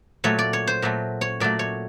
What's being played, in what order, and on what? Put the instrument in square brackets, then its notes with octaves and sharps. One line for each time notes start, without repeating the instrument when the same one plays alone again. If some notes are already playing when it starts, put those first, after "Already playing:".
[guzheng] A#2 F#3 A3 C#5
D5
C#5
C5
A#2 F#3 A3
C#5
A#2 F#3 A3 D5
C#5